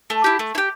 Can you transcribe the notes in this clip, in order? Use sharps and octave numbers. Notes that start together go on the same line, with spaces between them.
A3
E4 G4
A3
E4
G4